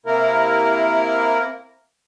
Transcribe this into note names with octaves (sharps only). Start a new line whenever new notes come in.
C3 A#3 E4 A#4